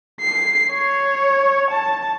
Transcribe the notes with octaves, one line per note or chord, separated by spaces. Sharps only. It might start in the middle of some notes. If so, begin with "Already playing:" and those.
C7
C#5
A5